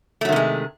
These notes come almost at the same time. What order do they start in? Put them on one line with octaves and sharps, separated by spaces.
A3 F#3 D#3 C3 G#3